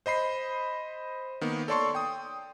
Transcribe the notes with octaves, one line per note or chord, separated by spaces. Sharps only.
C5 D#5 B5 C7
D#3 A#3 B3
A4 C#5 D5 A5 C6 C#6
G5 D#6